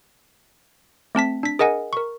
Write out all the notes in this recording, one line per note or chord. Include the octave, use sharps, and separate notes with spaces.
A3 C4 A5 B6
D4 B6
G#4 A#4 D#5 F#5 G#5
A#4 C#6